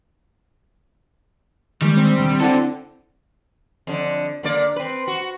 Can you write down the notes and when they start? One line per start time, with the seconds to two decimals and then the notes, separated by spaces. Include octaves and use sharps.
1.82 D#3 G3 G#3 A#3
1.97 C4
2.17 D#2 B2 D3
2.40 D3 E4 A4 D5 F#5
3.87 F2 D3
4.43 D3 A#3 D5
4.76 C4 B4
5.08 F#4